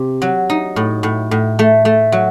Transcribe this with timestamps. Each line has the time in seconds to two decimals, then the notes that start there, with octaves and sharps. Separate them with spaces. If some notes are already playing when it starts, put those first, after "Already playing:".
Already playing: C3
0.22 F#3
0.50 D#4
0.76 A2
1.03 A2
1.31 A2
1.59 A3
1.85 A3
2.12 F#3